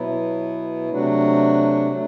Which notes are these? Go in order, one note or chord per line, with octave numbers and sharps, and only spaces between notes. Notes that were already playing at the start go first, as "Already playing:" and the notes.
Already playing: B2 F#3 B3 E4
C3 F#3 A3 D4 F#4
F#3 A3 D4